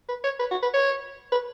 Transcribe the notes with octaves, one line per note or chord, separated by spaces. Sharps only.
B4
C#5
B4
F#4
B4
C#5
B4